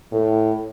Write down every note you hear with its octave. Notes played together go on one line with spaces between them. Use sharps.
A2